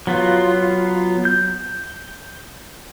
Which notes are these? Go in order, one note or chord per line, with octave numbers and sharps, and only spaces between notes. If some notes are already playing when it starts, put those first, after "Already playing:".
F#3 B3 F4
G6